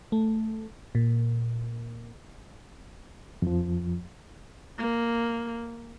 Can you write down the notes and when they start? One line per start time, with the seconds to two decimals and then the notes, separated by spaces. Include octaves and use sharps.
0.12 A3
0.95 A#2
3.42 F2 F3
4.78 A#3